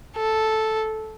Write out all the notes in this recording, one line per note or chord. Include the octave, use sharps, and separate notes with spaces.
A4